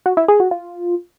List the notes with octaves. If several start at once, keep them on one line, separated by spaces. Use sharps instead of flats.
F#4
E4
G#4
F#4
F4